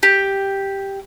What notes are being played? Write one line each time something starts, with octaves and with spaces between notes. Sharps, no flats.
G4